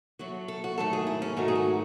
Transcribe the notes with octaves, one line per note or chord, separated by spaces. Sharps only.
A2 F#3 A3 F#4
A4
F#4
G#2 D#3 F#3 A3 A4
G#4
E4
C#4
G#2 D#3 F#3 A3 D#4
G#4
F#4